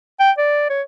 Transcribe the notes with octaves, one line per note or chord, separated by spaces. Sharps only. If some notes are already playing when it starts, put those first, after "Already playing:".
G5
D5
C#5